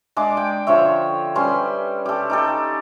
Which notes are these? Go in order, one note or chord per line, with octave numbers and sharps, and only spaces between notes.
G#3 D4 C6 D6
G5
D3 F3 C#5 E5
G3 C#4 B4 C6
G4 A4
D#4 G4 A4